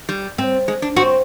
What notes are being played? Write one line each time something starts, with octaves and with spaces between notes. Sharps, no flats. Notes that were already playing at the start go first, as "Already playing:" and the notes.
G3
C4
G#3
D4
C4 F#4